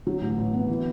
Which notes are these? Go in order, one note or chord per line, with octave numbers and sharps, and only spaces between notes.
F#3
A1
A1
B3
E3